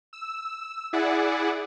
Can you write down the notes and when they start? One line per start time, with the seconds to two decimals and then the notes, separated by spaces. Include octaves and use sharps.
0.13 E6
0.93 E4 G#4 D5 F#5